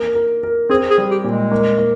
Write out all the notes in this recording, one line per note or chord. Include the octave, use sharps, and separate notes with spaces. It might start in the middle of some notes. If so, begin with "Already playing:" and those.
Already playing: A#3 A#4
A#4
A#4
C4 G#4
G#4
G3
G4
A#2
G#3
A#3
A#3